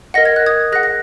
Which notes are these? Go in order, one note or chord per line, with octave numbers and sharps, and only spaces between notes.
A#4 D#5 F#5 A#6
G#6
F#6
D#6 G#6
G#4 F#5 F#6 A#6
A#6